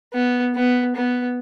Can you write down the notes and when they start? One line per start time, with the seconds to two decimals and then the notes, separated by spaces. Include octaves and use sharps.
0.14 B3
0.55 B3
0.96 B3